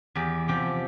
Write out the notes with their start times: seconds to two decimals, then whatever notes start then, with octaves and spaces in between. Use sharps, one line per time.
0.15 E2 G4
0.48 C3 F3 G4